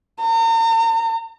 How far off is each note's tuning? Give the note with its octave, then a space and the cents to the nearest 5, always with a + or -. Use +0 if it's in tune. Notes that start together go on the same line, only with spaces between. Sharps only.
A#5 -40